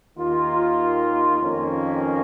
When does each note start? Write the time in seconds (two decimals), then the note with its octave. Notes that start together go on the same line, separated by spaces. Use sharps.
0.16 D#2 D#3 A#3 F4
1.41 F2 D#3 A#3 C#4